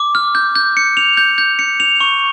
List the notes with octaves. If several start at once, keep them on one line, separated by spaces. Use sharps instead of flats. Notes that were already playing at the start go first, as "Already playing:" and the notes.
Already playing: D6
F6
G6
G6
C#7
F7
G6
G6
C#7
F7
C#6